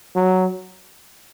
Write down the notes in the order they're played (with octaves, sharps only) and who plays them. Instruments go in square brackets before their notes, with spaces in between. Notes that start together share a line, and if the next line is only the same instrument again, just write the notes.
[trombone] F#3